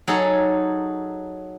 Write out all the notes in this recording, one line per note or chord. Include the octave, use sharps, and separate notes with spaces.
F#3 D#4 G#4 A4 C#5